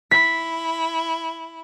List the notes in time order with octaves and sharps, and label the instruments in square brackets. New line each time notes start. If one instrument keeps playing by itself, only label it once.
[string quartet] E4 [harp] B6